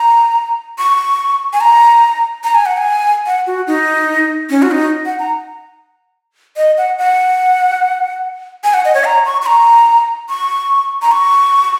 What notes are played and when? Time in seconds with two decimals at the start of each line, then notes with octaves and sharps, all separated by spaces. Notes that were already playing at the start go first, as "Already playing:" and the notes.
Already playing: A#5
0.78 C#6
1.53 G#5
1.61 A#5
2.44 A#5
2.55 G#5
2.66 F#5
2.77 G#5
3.26 F#5
3.47 F#4
3.67 D#4
4.50 C#4
4.62 F#4
4.71 D#4
5.06 F#5
5.19 A#5
6.57 D#5
6.78 F#5
6.98 F#5
8.64 G#5
8.74 F#5
8.85 D#5
8.95 C#5
9.05 A#5
9.25 C#6
9.42 C#6
9.46 A#5
10.29 C#6
11.02 A#5
11.12 C#6